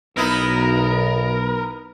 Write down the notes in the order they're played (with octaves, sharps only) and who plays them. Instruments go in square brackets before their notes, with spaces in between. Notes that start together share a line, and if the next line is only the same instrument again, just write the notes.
[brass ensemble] B1 [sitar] B3 D#4 E4 [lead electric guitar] A#4